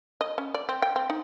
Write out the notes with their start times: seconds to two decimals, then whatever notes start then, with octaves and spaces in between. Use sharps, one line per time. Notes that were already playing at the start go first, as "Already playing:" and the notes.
0.21 D#5
0.38 C#4
0.54 D5
0.69 C4
0.82 G5
0.96 C4
1.10 D#4